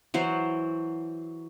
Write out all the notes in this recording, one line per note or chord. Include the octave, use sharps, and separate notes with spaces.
E3 F#3 C5